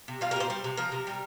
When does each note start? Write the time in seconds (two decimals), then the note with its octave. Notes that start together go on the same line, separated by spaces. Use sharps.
0.08 C3
0.21 G3 F4
0.31 A#4
0.36 A#2 C5
0.50 G3 C5
0.64 C3
0.77 F3 A#4
0.92 C3
1.07 G3